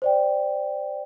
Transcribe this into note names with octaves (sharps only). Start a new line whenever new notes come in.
C5 D5 G5